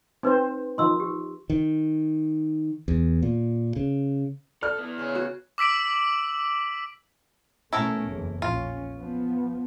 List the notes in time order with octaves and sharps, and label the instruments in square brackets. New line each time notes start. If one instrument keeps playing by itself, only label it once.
[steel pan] C4 C5 [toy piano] D#4 B4
[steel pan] D#3 F3 D#4 [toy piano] C6 E6
[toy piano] G4
[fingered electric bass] D#3
E2
A#2
C#3
[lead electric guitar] A4 [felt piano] D5 F6
[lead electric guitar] B3 E4
[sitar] C#3 C#4
[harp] F#4
[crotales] D6 E6 B6 D7 F#7
[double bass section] B2 A3 C#4 [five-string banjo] E4 A4 A#4
[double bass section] F#1 E2
[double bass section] A#1 C#4 [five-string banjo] F4
[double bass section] F3 B3